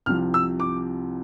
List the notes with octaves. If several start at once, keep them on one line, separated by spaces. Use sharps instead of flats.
C2 C3 F3 F6
E6
D6